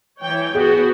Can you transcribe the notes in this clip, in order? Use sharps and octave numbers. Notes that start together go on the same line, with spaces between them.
E3 C#5 G5
B3 F#4 G#4